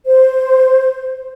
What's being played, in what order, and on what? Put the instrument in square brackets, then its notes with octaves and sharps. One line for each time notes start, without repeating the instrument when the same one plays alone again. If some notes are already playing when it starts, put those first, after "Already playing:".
[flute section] C5